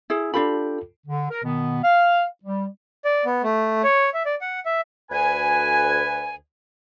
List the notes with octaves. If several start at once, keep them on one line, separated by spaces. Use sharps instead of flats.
E4 G#4
D4 F4 G4 A4 B5
D3
A#4
B2 D#3 B3
F5
G3
D5
B3
A3
C#5
E5
D5
F#5
E5
D2 B4 G#5